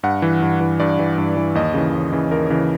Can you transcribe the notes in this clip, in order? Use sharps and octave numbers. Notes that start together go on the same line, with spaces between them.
G2 F#5
E3
G2
E3
G2 D5
E3
G2
E3
D#2 D#5
C#3 E3
D#2
C#3 E3
D#2 A#4
C#3 E3